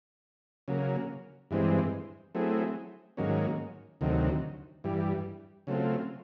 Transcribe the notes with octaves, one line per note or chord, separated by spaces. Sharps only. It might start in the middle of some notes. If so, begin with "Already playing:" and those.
C#3 F#3 A#3
G2 E3 G#3 C4
F#3 A3 C4 E4 G#4
G#2 D#3 F#3 A#3 C#4
D2 C3 D#3 F#3
G2 E3 G3
C#3 F#3 A3 C4 F4